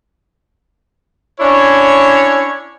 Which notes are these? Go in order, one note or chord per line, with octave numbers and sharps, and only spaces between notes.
C#4 D4 E4 C#5